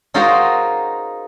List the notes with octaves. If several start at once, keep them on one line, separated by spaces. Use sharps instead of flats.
G#3 D#4 F4 F#4 A#4 C5